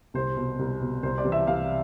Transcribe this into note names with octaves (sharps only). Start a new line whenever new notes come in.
C2 C5
B2
C2
B2
C2 C5
D5
C3 E3
E5
C2 F5